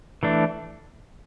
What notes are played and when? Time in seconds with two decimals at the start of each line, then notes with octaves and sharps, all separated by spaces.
0.23 E3 A3 D4